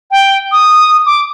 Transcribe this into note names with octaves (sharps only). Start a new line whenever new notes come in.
G5
D#6
D6